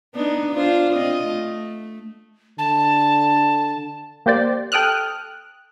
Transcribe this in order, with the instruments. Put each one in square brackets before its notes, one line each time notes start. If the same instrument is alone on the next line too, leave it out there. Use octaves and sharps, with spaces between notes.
[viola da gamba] B3 D4 D#4
D4 F4 C5
C4 F4 D#5
A3
[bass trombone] D3 [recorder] A5
[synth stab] A#3 G4 C5 D5
A4 G5 D#6 F6 F#6